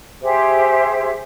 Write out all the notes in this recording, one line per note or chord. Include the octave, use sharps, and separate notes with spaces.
G4 G#4 C5 E5